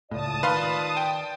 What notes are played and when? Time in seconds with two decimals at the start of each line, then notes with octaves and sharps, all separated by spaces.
0.11 C#2 A2 F4 D5 A5 D#6
0.43 D#3 B4 F5 C6
0.97 G5